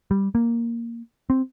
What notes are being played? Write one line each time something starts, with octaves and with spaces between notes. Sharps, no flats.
G3
A#3
C4